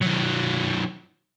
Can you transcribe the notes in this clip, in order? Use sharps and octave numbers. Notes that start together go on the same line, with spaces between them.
D#3 F#3